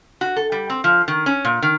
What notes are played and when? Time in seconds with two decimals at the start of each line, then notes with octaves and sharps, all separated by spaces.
0.21 F#4
0.36 A4
0.52 G3
0.70 C4
0.84 F3
1.08 D#3
1.26 C#4
1.45 A#2
1.62 D#3